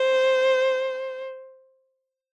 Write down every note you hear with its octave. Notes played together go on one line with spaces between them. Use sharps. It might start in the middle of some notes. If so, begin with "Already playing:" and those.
Already playing: C5